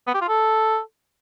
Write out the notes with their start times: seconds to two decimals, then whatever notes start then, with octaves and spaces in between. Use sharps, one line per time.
0.07 B3
0.14 G4
0.22 F4
0.29 A4